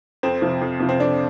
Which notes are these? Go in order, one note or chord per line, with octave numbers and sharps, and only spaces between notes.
F2 C4
C3 F3
F2
C3 F3
C4
F2 D4